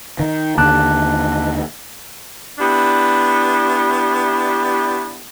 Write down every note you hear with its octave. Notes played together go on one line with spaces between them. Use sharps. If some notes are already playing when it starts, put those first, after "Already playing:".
D#3
D#2 D3 A5 D6 F#6
B3 D4 E4 G4